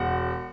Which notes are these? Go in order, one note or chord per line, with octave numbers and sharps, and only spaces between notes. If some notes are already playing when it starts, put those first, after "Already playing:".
Already playing: E1 F#5